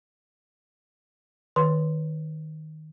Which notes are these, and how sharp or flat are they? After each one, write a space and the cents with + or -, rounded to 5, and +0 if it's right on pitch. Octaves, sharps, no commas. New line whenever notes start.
D#3 +0 B4 -5 C6 -5